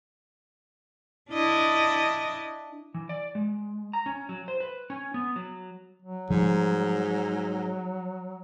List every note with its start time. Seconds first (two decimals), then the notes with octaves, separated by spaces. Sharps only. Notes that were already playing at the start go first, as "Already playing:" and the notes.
1.32 D4 E4 D#5
2.94 E3
3.09 D5
3.35 G#3
3.93 A#5
4.06 C#4
4.29 F#3
4.48 C5
4.60 B4
4.90 C#4
5.14 B3
5.36 F#3
6.02 F#3
6.30 G#2 F3 G3